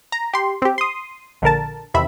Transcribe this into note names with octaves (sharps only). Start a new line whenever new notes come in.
A#5
G4 C6
C4 G4
C6 D#6
A#1 D3 A#4 A5
E2 C3 D#3 E5 B5